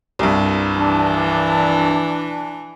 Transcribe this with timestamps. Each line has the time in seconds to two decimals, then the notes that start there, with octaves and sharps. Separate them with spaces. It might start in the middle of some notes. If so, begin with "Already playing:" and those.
0.19 C2 G2
0.78 E3 D4